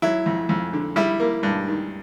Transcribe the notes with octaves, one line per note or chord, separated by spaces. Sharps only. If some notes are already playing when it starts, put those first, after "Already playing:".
F#3 E4
F2
F2
D3
G3 E4
A#3
G2
D#3